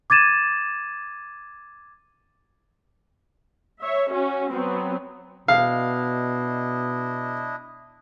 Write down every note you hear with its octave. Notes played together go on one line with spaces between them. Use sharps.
D6 G#6 A6 D#7 E7
C#5 E5
C#4 F#4
F#3 B3 C4 F#4
B2 D4 E4 D#5 F5